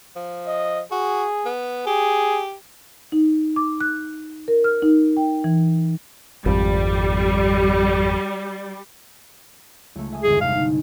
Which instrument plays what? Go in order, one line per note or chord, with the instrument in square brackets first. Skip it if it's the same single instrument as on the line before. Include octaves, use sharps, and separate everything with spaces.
[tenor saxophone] F3
[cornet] D#5
[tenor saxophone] F#4 [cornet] G#4
[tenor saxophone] B3
[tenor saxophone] G4 [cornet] G#4
[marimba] D#4
D6
F#6
A#4
F6
D#4
G5
E3
[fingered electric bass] G#1 F2 [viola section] G3
[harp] C#2 A3
E5 G#5 D#6
[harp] G1 E2 G#3 [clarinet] G#4
[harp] C3 D4 D#4 [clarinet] F5